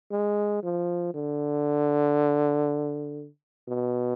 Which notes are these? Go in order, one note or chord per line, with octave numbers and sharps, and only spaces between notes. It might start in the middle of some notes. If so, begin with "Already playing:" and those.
G#3
F3
D3
B2